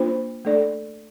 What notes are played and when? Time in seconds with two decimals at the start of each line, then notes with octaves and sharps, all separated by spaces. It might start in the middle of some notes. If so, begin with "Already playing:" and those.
Already playing: A#3 D4 F4 C5
0.45 A3 D4 A4 D5